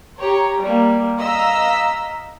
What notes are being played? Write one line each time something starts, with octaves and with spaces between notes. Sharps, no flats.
G4 C#5 A#5
G3 A#3
D#5 F5 A#5 E6 B6